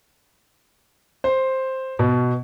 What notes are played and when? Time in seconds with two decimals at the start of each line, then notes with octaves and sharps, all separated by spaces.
1.24 C5
1.99 B2